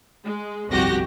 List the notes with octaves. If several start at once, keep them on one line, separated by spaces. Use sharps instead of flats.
G#3
G1 C2 F2 F#4 G4 A#6